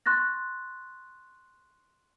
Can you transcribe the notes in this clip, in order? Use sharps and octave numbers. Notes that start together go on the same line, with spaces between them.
C6 C#6 F#6 A6 A#6